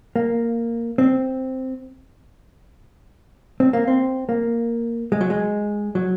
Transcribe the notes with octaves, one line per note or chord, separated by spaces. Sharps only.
A#3
C4
C4
A#3
C4
A#3
G#3
F#3
G#3
F#3